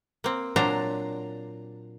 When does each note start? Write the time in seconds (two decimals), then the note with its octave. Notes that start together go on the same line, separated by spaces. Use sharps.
0.24 A#3 C4
0.56 A#2 F#3 D4 C5 A#5